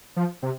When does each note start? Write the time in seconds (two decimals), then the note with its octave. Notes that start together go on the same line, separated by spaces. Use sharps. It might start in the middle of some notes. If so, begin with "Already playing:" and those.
0.16 F3
0.43 C3